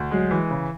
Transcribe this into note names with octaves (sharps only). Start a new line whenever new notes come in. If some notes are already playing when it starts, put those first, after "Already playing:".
Already playing: D2
F#3 G#3
E3
C#3